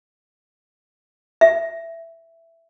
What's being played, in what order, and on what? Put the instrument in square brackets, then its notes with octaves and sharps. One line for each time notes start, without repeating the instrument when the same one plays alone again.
[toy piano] E5